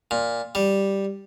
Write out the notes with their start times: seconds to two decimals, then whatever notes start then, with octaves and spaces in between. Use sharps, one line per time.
0.11 A#2
0.55 G3